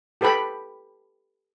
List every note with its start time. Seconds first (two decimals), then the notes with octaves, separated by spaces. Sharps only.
0.21 G4 A4 B4 G5 B5